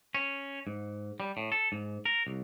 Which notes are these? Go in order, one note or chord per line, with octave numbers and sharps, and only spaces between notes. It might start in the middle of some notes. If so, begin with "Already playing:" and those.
C#4
G#2
G3
A2
A4
G#2
A#4
C2